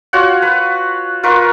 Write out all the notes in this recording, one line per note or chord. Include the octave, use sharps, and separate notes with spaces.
F4 F#4 C#5 F#5
B4
F4 A#4 B4 C#6